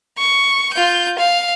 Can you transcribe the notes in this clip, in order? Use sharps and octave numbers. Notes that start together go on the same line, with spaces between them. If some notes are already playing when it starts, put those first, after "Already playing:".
C#6
F4 G6
F5